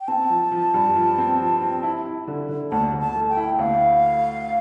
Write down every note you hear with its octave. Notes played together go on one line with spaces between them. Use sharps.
G5
C4 A5
F3
F3
G2
F3
C4
F3
C4
E4
E4
D3
D3
D2 A5
D2
A5
A3
G5
E4
D2 F5